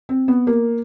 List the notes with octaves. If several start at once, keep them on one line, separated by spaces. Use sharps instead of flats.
C4
B3
A#3